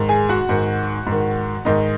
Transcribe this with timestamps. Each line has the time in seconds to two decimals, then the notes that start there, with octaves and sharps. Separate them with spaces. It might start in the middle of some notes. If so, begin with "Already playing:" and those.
Already playing: G#2 D#3
0.09 G#4 G#5
0.29 F#4 F#5
0.49 G#2 D#3
1.07 G#2 D#3
1.65 G#2 D#3 D#4 D#5